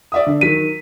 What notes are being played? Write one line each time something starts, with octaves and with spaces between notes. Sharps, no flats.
D5 E5 D#6
D3
D#3 F#3 B6 D#7